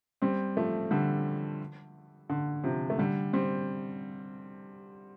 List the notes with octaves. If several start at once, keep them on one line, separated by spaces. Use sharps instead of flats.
G3 C4
F3 A3
D3 G3
D3
C3 F3
A3
D3 G3
G3 C4